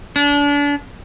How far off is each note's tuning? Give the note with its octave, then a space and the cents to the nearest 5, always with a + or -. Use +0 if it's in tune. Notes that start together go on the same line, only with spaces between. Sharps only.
D4 -35